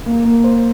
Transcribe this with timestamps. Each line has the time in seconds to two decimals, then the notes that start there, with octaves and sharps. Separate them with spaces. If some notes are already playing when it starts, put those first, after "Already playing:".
0.06 A#3
0.25 A#3
0.44 C5